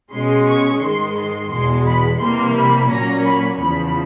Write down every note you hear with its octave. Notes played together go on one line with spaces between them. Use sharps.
B2 G#3 C#4 C6
C#6
G#2 D#3 G#3 C6
C6
E2 B2 G#3 C6
B5
C3 E3 G3 A#3 C6
B5
A#2 F#3 A#3 C#4 A#5
B5
E2 C#3 F3 B5